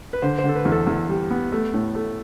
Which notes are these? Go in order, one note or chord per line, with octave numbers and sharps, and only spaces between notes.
B4
D3 C5
C5
D3
A4
B4
E2
A4
E2
G3
B3
A3
A2
A3